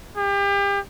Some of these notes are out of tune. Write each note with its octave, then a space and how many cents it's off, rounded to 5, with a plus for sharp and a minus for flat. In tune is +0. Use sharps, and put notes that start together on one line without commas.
G4 +35